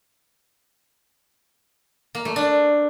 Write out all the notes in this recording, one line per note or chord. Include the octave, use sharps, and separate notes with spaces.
A#3
A3
D4